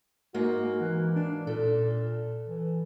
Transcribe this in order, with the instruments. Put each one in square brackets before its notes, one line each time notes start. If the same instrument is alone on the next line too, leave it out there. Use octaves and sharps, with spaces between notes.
[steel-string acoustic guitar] G#2 A#3 [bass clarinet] F#4
[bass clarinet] E3
D4
[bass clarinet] A#2 [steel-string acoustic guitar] A4
[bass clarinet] E3